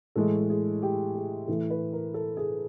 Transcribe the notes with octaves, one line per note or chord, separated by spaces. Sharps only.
A2 E3 G#3 A4
G#4
G4
G#4
A2 E3 A3 A4
B4
A#4
A4
G#4